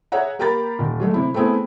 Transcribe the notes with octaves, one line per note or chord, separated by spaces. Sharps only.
G#4 C#5 E5 F#5 A#5
A#3 G4 A#4 A#5 B5 A6
D#1
F#3 G#3 A3
C3 E4
A3 B3 C4 E4 G#4